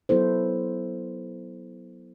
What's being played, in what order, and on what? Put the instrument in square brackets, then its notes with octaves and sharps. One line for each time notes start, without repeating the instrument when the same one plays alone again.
[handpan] F#3 B3 E4 A4 C5